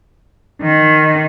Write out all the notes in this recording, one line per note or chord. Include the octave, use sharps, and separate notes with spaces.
D#3